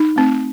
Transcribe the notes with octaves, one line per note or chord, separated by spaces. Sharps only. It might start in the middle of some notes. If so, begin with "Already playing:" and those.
Already playing: D#4
A3 C4